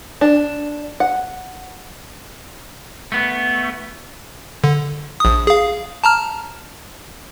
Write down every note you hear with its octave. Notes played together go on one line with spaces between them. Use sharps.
D4
F#5
A3 B3
D3
A#1 D#6
G#4 F5
A5 A#5 F6